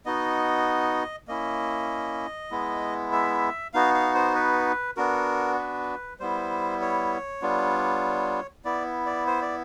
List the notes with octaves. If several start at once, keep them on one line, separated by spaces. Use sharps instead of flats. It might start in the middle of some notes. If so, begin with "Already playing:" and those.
B3 D#4 F#4 D#5
A#3 C#4 E4 D#5
G#3 B3 E4
E5
B3 D#4 F#4 F5
F5
C5
B4
B3 D4 F#4 A#4
B4
G3 B3 E4 C5
C#5
G3 B3 D4 F4
B3 E4 D5
D5
C5
D5